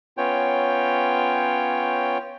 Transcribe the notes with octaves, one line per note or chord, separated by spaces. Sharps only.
B3 C#4 F4 C#5 G5